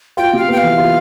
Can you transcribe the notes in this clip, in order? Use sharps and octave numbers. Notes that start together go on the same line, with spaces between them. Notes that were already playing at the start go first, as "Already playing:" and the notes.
F4 G5
C3 F5
B3 G5
F5
E3
F4